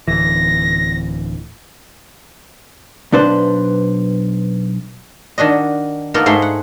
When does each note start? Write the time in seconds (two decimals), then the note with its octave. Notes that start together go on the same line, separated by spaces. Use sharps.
0.08 D1 E3 A#6
3.12 B1 B2 D4 B4 C5
5.38 D#3 D4 F#4 D#5
6.14 A#3 B3 D#4 F4 A4 A#4
6.26 G#2 A3 G#4 A#5 C6
6.42 F#5